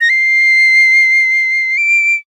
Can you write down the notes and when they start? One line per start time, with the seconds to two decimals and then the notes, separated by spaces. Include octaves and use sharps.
0.01 A#6
0.10 C7
1.78 D7